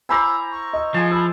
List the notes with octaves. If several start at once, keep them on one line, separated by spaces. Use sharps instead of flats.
E4 C5 G#5 A#5 B5 D6 E6
C#6
D#5 E6
F3 G#3 G#5 A5
B5 E6